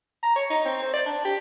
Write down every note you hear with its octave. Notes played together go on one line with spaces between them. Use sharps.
A#5
C#5
D#4
C4
C5
D5
D4
G4